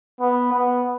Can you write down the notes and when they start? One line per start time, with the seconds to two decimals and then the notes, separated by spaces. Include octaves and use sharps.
0.21 B3
0.53 B3